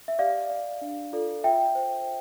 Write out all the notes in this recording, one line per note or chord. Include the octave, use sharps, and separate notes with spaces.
E5
G4 D5 F5
D5
D4
F4 A4 D5
F4 E5 G5
C5